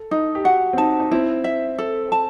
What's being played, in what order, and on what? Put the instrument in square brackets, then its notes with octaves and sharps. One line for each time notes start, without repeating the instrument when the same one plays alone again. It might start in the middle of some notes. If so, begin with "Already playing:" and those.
Already playing: [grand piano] A4
[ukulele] D#4
[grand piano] G4
[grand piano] F#4 [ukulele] F#5
[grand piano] C4
[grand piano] D#4 [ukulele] A5
[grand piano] D#4
[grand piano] C4 [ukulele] E4
[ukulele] E5
A4
A5